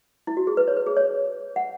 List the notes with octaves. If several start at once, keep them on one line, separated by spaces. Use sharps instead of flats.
E4
F#4
G#4
B4
C#5
B4
G#4
C#5
F#5